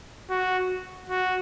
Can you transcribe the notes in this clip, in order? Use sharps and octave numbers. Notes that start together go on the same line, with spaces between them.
F#4
F#4